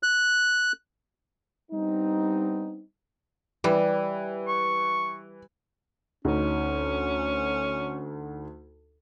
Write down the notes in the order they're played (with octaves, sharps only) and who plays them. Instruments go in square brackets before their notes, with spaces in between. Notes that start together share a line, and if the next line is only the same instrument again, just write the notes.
[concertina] F#6
[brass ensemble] G3 B3 C4 D4 D#4
[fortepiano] E3 [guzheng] G3
[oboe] C#6
[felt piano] D2 D#4 [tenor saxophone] C#4